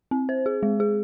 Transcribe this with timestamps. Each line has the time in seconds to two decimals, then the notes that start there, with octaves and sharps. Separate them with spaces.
0.11 C4
0.29 C5
0.46 G#4
0.63 G#3
0.80 G#4